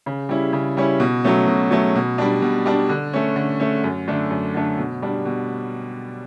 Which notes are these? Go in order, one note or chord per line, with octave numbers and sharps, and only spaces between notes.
C#3
G3 C#4 E4
C#3
G3 C#4 E4
B2
F#3 A3 C#4
B2
F#3 A3 C#4
B2
G3 D4
B2
G3 D4
D3
A3 C#4
D3
A3 C#4
F#2
D3 A3 D4
F#2
D3 A3 D4
B2
G3 D4
B2